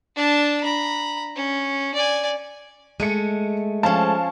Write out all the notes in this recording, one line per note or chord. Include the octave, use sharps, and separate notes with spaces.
D4 A5
A#5 B5
C#4
D5 G#5
G#3 A3 C#7 D#7
F3 C#4 F5 A5